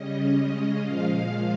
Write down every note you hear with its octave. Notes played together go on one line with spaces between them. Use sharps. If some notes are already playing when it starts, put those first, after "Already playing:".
Already playing: C#3 G3 C#4 D#5
C#3 G#3 C#4
A#2 F3 G#3 F5